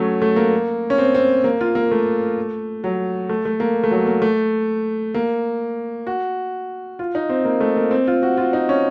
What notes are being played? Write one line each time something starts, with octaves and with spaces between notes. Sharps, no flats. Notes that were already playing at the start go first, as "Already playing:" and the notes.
Already playing: F#3 A3 C#4
A3
A#3
C#4
C4
C4
A#3
F4
A#3
A3
F#3
A3
A3
A#3
A3
F#3
A#3
A3
A#3
F#4
F4
D#4
C4
A#3
A3
A#3
C4
F4
F#4
F4
D#4
C#4